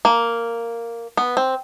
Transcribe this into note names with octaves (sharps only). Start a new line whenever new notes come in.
A#3
B3
C4